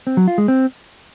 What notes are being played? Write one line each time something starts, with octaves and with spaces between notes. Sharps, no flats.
C4
F#3
F4
G#3
C4